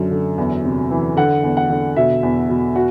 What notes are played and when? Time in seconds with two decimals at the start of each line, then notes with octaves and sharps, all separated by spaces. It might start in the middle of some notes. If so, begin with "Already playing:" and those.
Already playing: F#2 D3
0.11 D3
0.38 E2
0.64 C3
0.91 E3
1.17 D3 F#5
1.43 E2
1.57 F#5
1.70 D3
1.96 B2 E5
2.23 E2
2.49 B2
2.76 F#4